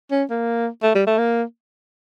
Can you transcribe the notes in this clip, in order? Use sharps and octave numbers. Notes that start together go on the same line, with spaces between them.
C#4
A#3
A3
G3
A3
A#3